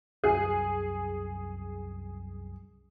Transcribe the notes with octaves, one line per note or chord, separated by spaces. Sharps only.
C2 F#2 G#4